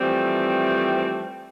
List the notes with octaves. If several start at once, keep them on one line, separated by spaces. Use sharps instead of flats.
E3 F3 G3 A3 C4